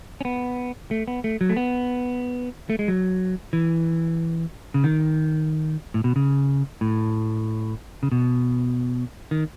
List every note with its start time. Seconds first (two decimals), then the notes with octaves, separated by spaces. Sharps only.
0.21 C#4
0.25 B3
0.91 A3
1.08 B3
1.24 A3
1.41 F#3
1.49 A3
1.57 B3
2.70 A3
2.79 G#3
2.88 F#3
3.53 E3
4.74 C#3
4.84 D#3
5.94 A2
6.04 B2
6.16 C#3
6.81 A2
8.03 C#3
8.12 B2
9.31 D#3